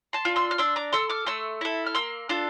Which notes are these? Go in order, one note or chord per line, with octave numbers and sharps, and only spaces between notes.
A5 C6
D4 F4
C6 E6
F6
D4 C6 E6
A#5 D6
A4 C6 E6
D6 F6
A3 C6 E6
E4 A4
F6
A#3 C6 E6
D4 F4 A4